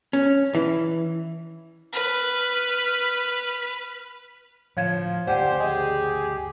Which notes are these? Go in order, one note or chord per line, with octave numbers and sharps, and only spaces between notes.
C#4
E3
B4 F6
A2 D3 F3 C#5 F5 G#6
D2 G2 C#3 G4 C5 D5 F#5 G#5
G#4 D#5